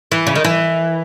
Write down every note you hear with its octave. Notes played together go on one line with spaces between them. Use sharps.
E3
C#3
D#3
E3